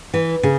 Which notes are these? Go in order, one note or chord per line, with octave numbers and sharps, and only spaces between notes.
E3
C#3